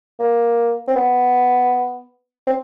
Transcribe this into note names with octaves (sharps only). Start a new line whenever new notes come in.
A#3
C4
B3
C4